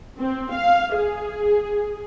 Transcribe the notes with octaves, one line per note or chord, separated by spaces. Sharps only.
C4
F5
G#4